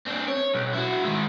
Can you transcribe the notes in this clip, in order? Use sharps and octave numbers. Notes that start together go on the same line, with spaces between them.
C4 D4
C#5
B1
E4 F#4
D#3 G#3